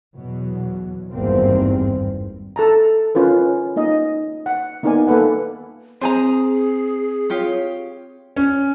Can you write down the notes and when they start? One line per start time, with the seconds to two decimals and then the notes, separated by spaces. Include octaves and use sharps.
0.15 E2 B2 F#3
1.12 G#1 E2 G2 G3 A#3 C4
2.56 A4 A5 A#5
3.15 C#4 F4 A#4 B4
3.76 A#3 D#4 D#5
4.46 F#5
4.83 A#3 B3 D#4 A#4 D5 G#5
5.07 A#3 A4 B4 F#5
6.01 C4 G#4 C5 G#5 A#5
7.30 F4 G4 C#5
8.36 C#4